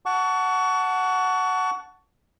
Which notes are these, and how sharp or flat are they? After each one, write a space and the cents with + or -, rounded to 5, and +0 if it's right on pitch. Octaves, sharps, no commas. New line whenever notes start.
F#5 +0 A5 +0 C#6 +30